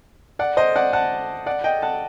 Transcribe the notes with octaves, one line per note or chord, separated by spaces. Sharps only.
D5 F#5
C5 D#5
D5 F#5
F#5 A5
D5 F#5
D#5 G5
F#5 A5